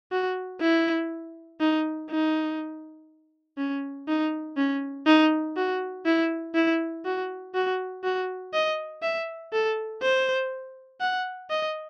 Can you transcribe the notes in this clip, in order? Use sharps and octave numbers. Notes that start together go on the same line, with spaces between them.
F#4
E4
D#4
D#4
C#4
D#4
C#4
D#4
F#4
E4
E4
F#4
F#4
F#4
D#5
E5
A4
C5
F#5
D#5